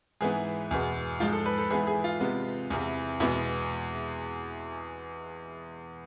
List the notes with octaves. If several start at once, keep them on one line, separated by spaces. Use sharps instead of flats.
G#2 E3 B3 G#4
E2 B2 G#3 B3
G#2 F3 G#3 F4
A4
B4
A4
G#2 E3 B3 G#4
G#4
F4
C3 G#3 B3
E2 C3 E3
E2 B2 G#3 B3 E4